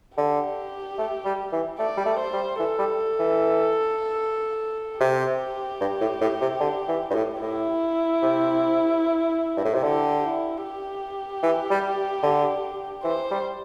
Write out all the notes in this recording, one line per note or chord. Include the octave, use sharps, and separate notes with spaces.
D3 G4
A3
G3
E3
A3 D5
G3
A3
C5
G3
E3 A4
G3
E3
C3 G4
G2
A2
A2
C3
D3
E3
G2
A2
A2 E4
C3
G2
A2
C3
D3 G4
E4
G4
E3
G3
D3
E3 C5
G3